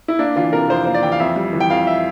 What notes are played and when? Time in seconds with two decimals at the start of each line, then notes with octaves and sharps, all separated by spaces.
0.08 E4
0.19 A#3 D4
0.36 E3 F4
0.53 C3 A#4
0.69 F2 C5
0.85 A#3 C5
0.94 D5
1.03 E3 G5
1.12 F5
1.20 F2 E5
1.36 G3
1.53 E3
1.60 G5
1.70 F2 F5
1.87 E5